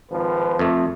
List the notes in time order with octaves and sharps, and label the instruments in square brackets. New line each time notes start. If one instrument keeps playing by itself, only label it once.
[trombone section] G#1 F3 B4
[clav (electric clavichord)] F2 A3